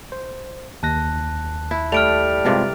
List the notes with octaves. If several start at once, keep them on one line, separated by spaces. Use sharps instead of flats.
C5
D#2 A5 F#6 A#6
E4
G3 A3 F6 D7 F7
G2 C3 G#3 C4 D4 F4